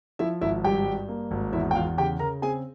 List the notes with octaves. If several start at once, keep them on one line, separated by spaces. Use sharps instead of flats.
F3 E4 E5
G#1 E4 E5
G2 G4 G5
G2
A#3
G#1
E2 E4 E5
G5
E2 F4 F5
C#3 G4 G5
C#3 A#4 A#5
C4 G#4 G#5